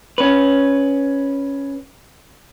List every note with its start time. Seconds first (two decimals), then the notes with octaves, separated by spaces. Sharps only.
0.18 C#4 B4